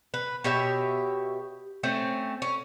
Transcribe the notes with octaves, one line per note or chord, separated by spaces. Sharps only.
B4
B2 G4 C#5 E5
A3 C4 C#4
C#4